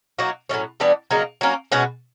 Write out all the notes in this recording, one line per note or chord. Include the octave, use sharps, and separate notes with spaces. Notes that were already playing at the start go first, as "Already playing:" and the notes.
F#3 A#3 D#4 F#4
A2 F#3 A3 C#4
E3 G3 B3 D4
C#3 F#3 A#3 D#4
F#3 A#3 C#4
B2 G#3 C#4 F#4